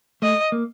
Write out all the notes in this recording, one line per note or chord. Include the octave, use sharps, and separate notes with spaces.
A3 D#5
A#3